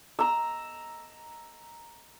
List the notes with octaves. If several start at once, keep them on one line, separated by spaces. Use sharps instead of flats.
A#5 E6